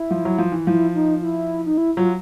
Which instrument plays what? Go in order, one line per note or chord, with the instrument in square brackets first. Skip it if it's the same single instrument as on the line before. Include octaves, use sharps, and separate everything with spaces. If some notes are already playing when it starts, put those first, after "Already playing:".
Already playing: [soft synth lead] E4
[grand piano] F3
F#3
F3
E3
[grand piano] F3 [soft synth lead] E4
[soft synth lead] D#4
E4
D#4
E4
[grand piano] F#3 [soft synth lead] F4